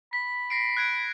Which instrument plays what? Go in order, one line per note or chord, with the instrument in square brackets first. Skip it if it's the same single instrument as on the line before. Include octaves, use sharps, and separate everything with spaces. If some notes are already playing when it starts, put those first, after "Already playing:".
[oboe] B5 [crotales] B6
[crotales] A#6 C7 D7
F#6 G#6 D7